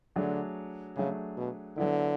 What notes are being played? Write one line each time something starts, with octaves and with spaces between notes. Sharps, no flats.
D3 F#3 A3 D4 G#4
C#3 F#3 A3 D4 G#4
B2
D3 F#3 B3 E4